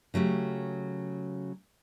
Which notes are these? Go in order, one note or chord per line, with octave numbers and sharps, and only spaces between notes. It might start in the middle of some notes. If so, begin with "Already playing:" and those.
C#3 F#3 A3 G4